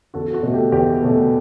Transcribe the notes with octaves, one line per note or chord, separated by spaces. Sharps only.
E2 F#4 A4
F#4 A4
B2 A3
G4
E2 G4
B2 A3